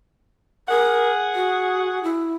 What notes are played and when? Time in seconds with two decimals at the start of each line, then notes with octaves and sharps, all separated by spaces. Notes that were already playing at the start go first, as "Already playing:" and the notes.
0.69 G#4 A#4 F#5
1.35 F#4
2.04 E4